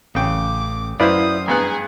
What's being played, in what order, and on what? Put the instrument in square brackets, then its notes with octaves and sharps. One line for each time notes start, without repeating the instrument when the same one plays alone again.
[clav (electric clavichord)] A1 [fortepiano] C#3 G5 [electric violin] D6
[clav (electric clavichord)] F#2 [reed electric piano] E4 B4 D5 [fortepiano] C5 E5 F5 [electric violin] D#6
[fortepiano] G2 B3 F#6 [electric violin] G#4 G#5 [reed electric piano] A#5